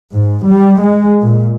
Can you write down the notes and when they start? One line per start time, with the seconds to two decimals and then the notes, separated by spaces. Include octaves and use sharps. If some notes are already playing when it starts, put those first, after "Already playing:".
0.13 G#2
0.44 G3
0.81 G#3
1.22 A#2